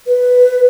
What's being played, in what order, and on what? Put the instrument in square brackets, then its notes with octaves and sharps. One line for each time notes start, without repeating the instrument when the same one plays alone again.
[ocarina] B4